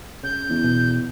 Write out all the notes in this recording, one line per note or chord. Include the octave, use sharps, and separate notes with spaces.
C#3 G6
E2
B2